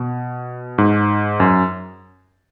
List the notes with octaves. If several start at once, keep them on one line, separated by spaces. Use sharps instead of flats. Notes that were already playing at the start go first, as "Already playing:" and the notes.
Already playing: B2
G#2
F#2